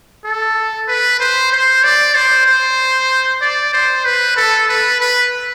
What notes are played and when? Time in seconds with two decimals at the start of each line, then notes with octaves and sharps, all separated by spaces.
0.25 A4
0.88 B4
1.20 C5
1.52 C5
1.84 D5
2.15 C5
2.47 C5
3.42 D5
3.74 C5
4.05 B4
4.37 A4
4.69 B4
5.01 B4